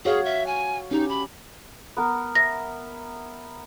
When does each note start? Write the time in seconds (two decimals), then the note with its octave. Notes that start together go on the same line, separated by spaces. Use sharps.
0.05 F#4 G#4 C#5 F5
0.25 E5
0.47 G#5
0.91 C#4 D#4 G4
1.09 B5
1.97 B3 A#4
2.35 E5 A#6